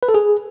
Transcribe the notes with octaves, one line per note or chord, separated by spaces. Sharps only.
B4
A4
G#4